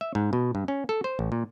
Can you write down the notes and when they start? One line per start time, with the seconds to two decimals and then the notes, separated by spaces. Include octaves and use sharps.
0.01 E5
0.15 G#2
0.33 B2
0.55 G2
0.68 C#4
0.89 A4
1.04 C5
1.19 A1
1.32 A#2